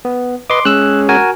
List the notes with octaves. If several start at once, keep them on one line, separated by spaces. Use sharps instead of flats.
B3
B4 D#5 C6 D6
G#3 C#4 E6 F#6
F#4 A#4 G#5